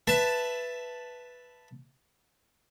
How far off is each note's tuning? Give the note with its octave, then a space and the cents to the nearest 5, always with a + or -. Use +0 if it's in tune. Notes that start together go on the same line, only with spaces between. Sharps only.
B4 +0 E5 +15 A5 +0